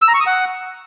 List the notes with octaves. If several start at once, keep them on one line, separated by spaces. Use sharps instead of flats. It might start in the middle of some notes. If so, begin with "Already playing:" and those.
E6
A#5
C#6
D#6
F#5